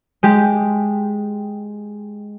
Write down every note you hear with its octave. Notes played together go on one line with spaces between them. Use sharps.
G#3 G4